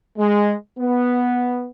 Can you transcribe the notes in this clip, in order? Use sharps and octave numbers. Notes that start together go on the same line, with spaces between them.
G#3
B3